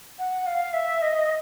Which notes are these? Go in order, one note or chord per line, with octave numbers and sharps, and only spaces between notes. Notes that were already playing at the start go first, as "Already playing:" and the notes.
F#5
F5
E5
D#5